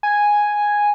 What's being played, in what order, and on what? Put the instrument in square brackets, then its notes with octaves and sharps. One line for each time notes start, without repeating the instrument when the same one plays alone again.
[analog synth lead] G#5